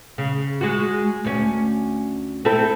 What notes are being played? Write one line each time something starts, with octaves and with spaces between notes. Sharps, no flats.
C#3
G#3 F#4
D2 C#4
C4 E4 A4